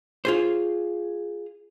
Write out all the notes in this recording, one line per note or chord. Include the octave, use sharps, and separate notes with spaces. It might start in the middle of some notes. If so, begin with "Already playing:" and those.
F4 G#4 C5